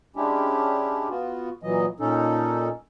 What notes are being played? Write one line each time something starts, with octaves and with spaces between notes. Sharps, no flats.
G#3 C#4 D4 E4 G4
B3 F4 F#4
A#2 E3 F#3 D#5
A#2 C#4 D#4 A4